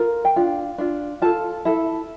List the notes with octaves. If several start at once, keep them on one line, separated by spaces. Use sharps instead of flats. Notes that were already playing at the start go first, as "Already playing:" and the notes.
Already playing: F4 A#4
G5
D4 F4
D4 F4
F4 A4 A5
E4 A4